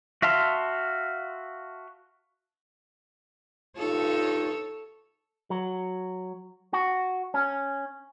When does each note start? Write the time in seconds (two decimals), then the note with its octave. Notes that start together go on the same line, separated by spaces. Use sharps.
0.22 F#4 E5 F5 A5 C6
3.78 G2 D#4 F4 A4 C#5
5.50 F#3
6.73 F#4
7.34 C#4